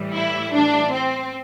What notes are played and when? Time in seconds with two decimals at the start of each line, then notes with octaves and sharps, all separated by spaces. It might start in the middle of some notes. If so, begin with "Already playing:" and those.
Already playing: A2 E3 G3
0.13 E4
0.54 D4
0.92 C4